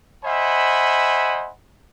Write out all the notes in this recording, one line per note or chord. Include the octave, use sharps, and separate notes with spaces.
C5 D#5 E5 F#5 G#5 B5